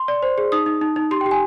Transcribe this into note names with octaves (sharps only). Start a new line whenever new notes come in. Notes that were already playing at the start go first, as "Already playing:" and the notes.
Already playing: C6
D5
C5
G#4
D#4 D#6
D#4
D#4
D#4
G4 C6
G5
G4
G#5